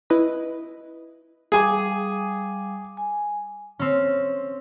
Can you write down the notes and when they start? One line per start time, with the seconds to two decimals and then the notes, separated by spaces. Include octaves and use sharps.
0.10 E4 B4 D#5 B5
1.52 G3 G#4 F5 G#5 D6
2.97 G#5
3.79 C4 C#4